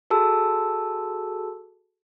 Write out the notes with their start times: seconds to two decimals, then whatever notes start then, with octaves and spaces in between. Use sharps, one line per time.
0.10 F#4 G#4 A4 A5 E6